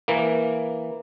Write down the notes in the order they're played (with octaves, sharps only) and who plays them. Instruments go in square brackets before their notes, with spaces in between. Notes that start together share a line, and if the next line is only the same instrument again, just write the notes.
[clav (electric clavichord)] E3 A#3